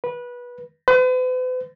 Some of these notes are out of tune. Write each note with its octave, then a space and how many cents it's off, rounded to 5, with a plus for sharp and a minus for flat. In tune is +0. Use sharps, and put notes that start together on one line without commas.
B4 -20
B4 +45